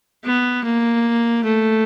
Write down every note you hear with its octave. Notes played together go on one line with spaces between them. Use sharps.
B3
A#3
A3